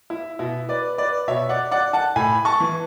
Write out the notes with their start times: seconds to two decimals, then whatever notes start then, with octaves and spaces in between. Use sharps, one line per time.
0.10 E4
0.39 B2 E4
0.69 B4 D5
0.98 B4 D5
1.28 B2 C#5 E5
1.49 D5 F#5
1.71 D5 F#5
1.93 F#5 A5
2.16 A2 G#5 B5
2.45 A5 C#6
2.60 E3